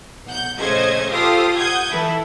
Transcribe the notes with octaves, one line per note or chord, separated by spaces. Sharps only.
B1 F#5 G6
A#1 C#3 A3 C5 D#5 G#6
F4 G4 A4 C5 F5 D#6
F#5 D#6 G6 G#6
E3 E4 A4